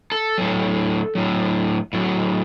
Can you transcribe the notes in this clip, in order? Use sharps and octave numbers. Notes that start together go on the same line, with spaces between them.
A4
A2 F#3
A2 F#3
A2 F#3